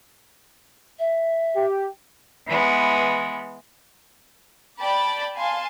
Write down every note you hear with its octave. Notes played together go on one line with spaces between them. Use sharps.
E5
G4
E3 G#3 B3
D5 G5 A5 B5 D6
F5 G#5 A5 C6